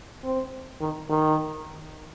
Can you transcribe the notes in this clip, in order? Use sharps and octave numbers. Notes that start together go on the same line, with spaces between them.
C4
D#3
D#3